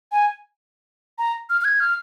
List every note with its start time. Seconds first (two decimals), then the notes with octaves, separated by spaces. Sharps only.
0.12 G#5
1.18 A#5
1.50 F6
1.61 F6
1.65 G#6
1.80 F6